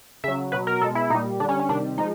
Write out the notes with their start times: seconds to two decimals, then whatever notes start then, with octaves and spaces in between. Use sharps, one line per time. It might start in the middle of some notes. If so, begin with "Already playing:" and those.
0.24 C#3 F#3 E5
0.52 B2 F#3 B4
0.67 A#4
0.81 B2 A4
0.84 G#3
0.95 E4
1.10 A#2 D#4
1.14 G3
1.40 D3 D4
1.44 G3 C#4
1.60 C#4
1.69 C3 D#3 G3 D4
1.98 F3 G#3 D#4